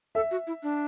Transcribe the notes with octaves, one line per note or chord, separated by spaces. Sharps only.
A4 E5
F#4
E4
D4